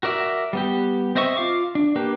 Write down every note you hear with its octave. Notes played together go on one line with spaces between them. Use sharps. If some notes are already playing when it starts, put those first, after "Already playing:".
F#4 A#4 D5 E5
G3 B3 G4
C4 C5 D#5 E5 C#6
F4 F5 D6
D4
A#3 D4 G4 B4